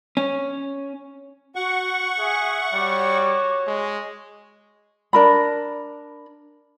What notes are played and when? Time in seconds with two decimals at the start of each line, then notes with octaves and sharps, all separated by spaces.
0.17 C#4
1.56 F#4 F#5 C#6
2.19 G#4 E5
2.74 G3 F#4 C#5 D6
3.67 G#3
5.13 D4 A#4 B5